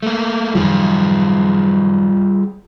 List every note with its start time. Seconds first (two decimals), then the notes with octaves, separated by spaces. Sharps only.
0.03 A3 A#3
0.55 F#2 D#3 F3 G3 F4 G#4